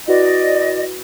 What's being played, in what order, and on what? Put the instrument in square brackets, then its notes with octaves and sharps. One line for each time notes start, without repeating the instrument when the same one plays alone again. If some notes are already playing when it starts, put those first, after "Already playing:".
[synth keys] E4 F#4 B4 [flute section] D5 D#5